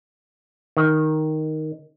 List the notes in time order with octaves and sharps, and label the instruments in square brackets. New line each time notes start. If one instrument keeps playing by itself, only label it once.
[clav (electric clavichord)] D#3